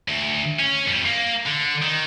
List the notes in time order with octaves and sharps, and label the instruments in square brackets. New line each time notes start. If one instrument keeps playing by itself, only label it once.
[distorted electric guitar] D2
C#4
F2 G3
A#3
D3
D#3